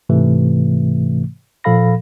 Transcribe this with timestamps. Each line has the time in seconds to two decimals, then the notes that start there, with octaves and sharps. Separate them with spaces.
0.09 G#2 C3 E3 A3
1.64 A#2 F3 A4 F5 B5 A#6